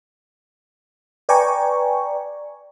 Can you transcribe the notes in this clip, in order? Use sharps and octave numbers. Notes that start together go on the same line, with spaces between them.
B4 D5 G5 G#5 A#5 C#6